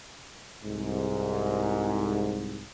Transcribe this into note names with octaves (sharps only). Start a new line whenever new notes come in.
C2 G#2